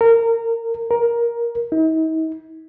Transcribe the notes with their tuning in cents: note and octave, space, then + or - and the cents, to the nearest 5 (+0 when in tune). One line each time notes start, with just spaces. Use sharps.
A#4 -25
A#4 +10
D#4 +45